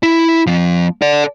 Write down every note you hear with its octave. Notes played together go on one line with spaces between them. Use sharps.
E4
F3 C4
A4 D5